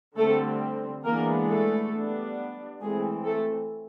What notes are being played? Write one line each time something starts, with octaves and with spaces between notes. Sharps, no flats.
D3 G3 A3 C4 A4
E3 G#3 A#3 B3 D4 A#4
A3 A4
G3 B3 D4
E3 G#3 A3 C4 G#4
A3 A4